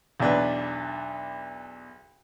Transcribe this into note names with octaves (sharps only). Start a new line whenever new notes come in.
B1 E2 D4 B4